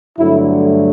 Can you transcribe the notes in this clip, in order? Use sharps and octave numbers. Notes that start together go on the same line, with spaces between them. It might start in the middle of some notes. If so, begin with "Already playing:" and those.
G2 D3 F#3 A3 E4